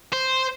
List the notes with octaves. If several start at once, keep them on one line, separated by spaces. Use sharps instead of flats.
C5